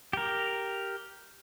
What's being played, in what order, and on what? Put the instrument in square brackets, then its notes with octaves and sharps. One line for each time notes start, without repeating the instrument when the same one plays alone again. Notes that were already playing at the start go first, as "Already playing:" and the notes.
[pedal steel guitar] G4 A#4